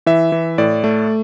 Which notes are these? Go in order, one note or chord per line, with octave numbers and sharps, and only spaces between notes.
E3 E5
E3
A2 D5
A3